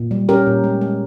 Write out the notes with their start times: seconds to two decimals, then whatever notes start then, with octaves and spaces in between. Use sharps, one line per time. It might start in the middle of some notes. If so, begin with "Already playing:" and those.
Already playing: A#2
0.11 G3
0.29 C#4 G4 A#4
0.47 A#2
0.64 G#3
0.81 G#3